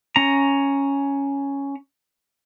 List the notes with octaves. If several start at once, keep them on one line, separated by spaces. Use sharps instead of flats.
C#4 A#5